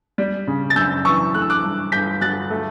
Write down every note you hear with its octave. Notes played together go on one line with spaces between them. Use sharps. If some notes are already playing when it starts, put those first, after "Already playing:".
G3
C#3
A6
F#2 E6 G6
E3 C#6 E6
A3 F#6
E6
D6 F#6
G2
G1 G6 B6
F#3 F#6 A6
A3